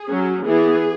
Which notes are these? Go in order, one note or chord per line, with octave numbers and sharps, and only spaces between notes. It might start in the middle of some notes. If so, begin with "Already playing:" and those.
Already playing: G#4
F#3 C#4
E3 B3 G#4